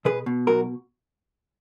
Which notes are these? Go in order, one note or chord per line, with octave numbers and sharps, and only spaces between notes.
B2 G#4 B4
B2
B1 F#4 A#4